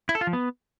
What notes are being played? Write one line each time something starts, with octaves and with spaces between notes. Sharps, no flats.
E4
A4
F4
F3
B3